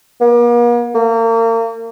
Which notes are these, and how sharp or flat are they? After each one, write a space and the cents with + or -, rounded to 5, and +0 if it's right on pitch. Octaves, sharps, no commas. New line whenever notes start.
A#3 +45
A#3 -35